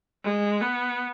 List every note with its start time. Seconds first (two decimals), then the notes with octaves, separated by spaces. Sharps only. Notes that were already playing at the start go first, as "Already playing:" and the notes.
0.24 G#3
0.62 B3